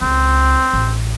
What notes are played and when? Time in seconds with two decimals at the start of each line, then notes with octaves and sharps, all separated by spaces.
0.01 C#2 C4
0.73 A1